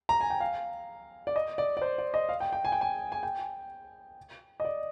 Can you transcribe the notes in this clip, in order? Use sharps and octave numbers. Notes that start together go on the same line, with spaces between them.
A#5
G#5
G5
F5
D5
D#5
D5
D5
C5
D5
D#5
F5
G5
G5
G#5
G5
G#5
G#5
G5
D#5
D5